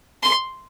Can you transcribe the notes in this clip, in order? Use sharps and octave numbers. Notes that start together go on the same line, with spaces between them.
C6